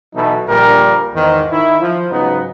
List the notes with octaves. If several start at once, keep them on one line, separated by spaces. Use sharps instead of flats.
B2 E3 F#3 D#4 E4 A4
A#1 A#2 D3 G3 A#4
E2 G#2 D#3
D#3 E4
F3
G#2 C#3 F#3 B3 D#4